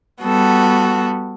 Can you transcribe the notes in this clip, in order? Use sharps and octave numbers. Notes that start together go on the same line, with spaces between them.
G3 B3 F#4 A4